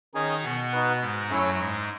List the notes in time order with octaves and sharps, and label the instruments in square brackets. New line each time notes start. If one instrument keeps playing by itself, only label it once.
[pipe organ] D#3 D#4 [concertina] C#4 G#4 D#5 G#5
[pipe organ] B2 B3
[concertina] D#4 F#4 B4 F#5
[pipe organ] G#2 G#3
[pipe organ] F#2 F#3 [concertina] A3 C#4 E4 A4 C#5
[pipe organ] G#2 G#3